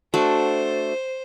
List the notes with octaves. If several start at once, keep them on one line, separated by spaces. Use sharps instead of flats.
A3 D4 F#4 C5